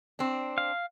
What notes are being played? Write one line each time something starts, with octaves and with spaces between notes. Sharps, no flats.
C4 D4
F5